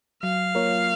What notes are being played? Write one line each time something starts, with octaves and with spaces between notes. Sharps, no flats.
F#3 F5
A#3 F4 A#4 C#5